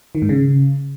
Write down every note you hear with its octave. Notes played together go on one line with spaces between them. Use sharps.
D#3
G#2
C#3